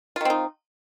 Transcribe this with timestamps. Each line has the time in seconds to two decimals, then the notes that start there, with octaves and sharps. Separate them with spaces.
0.16 F4
0.21 D#3
0.25 C4
0.30 D#4